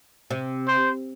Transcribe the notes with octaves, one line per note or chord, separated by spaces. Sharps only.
C3
C5